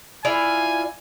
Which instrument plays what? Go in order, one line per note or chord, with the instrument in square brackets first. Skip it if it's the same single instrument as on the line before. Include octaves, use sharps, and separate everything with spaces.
[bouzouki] E4 F4 D5 [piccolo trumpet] G#5